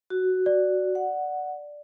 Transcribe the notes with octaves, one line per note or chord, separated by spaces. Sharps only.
F#4
D5
F#5